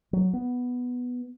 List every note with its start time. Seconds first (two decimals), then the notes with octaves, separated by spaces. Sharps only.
0.13 F#3
0.33 B3